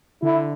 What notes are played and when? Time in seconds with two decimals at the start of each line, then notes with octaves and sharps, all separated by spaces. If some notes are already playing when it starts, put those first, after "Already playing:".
0.23 D3 E4